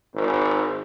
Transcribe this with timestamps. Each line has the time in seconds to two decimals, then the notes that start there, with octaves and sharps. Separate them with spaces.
0.15 G#1